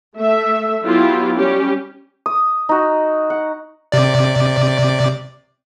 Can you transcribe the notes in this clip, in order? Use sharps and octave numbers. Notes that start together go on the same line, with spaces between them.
A3 E5
F#3 B3 E4 F4 G4
G3 C#4 G4
D#6
D#4 F#4
F#5
C3 D5